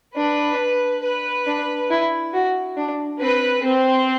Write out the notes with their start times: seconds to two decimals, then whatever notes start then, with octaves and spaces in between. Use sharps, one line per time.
0.16 D4 B4
1.03 B4
1.47 D4
1.90 E4
2.34 F#4
2.77 D4
3.21 C4 B4
3.64 C4